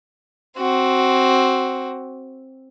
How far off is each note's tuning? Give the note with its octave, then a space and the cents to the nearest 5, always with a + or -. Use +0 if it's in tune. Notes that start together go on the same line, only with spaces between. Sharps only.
C4 +10 F#4 +15